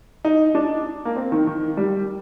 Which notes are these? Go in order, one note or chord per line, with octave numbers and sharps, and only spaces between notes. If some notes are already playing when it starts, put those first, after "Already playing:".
D#4
D4
A#3
C4
D#3
D#3
G3